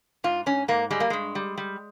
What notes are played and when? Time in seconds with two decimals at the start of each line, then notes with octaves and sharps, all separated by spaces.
0.24 G#2 F4
0.46 G#2 C#4
0.68 G#2 A#3
0.90 G3 G#3
1.00 A#3
1.10 G2 G#3
1.35 G3
1.58 G3